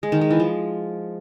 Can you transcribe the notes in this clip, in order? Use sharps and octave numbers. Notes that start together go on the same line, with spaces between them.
G#3
D#3
G#3
E3
F3